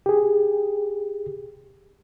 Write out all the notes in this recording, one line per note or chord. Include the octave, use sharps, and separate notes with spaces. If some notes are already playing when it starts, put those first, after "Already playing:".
G4 G#4